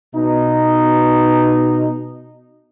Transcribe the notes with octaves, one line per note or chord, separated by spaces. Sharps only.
B2 D#4